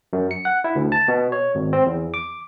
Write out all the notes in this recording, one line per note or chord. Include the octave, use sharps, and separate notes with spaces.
F#2
C#7
F#5
E4
D2
A5
B2
C#5
G#1
C4
E2
D6